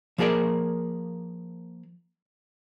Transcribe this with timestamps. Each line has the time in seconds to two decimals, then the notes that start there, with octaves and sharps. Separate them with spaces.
0.18 F3 A#3 G#4 A#4 D5